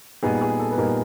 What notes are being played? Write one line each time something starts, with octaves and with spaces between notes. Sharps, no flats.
A#2 G3 B3 D#4 G#4
G#4
A4
B4
A#2 G3 B3 D#4 A#4